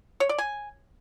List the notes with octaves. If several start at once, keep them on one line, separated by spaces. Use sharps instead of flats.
C#5
D5
G#5